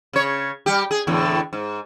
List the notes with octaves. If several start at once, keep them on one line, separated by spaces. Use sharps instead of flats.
C#3 C#5
G3 G4
G#4
E2 A2 D3
G#2